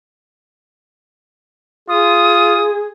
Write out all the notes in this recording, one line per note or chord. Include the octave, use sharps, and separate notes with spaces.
F4 G#4 D#6